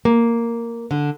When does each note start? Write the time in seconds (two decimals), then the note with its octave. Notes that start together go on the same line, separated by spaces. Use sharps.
0.05 A#3
0.91 D3